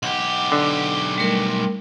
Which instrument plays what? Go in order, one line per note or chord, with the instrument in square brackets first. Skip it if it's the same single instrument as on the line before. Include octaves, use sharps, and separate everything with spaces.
[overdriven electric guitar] B1 G4 [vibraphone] F#5
[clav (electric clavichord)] D3
[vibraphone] G3 A3 A#4